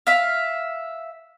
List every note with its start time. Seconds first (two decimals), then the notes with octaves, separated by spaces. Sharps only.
0.07 E5 F5